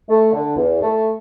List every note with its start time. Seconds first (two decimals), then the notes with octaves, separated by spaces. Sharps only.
0.08 A3
0.32 D3
0.57 E2
0.82 A3